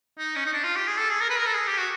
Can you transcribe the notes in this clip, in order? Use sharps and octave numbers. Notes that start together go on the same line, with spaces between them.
D#4
C#4
D#4
D4
F4
G4
G#4
A4
G#4
A#4
B4
A#4
A4
G#4
G4
F#4